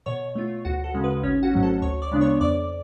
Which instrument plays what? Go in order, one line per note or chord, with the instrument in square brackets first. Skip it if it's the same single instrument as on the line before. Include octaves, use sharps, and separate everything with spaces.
[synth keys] B2 C#5 C#6
A3 F4
D2 F#4 F#5
A4
C#3 G#3 C#4
B4
G#1 C#4 C#5
F#4 F#5
G#2 F#3 A3 C#4
A4 A5
D2 C#5 C#6
D5 D6
C#3 G#3 B3 D4
C#5 C#6
F2 D5 D6